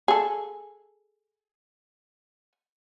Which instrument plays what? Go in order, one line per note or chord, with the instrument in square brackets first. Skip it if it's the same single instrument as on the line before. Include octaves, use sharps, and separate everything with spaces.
[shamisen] G#4 A4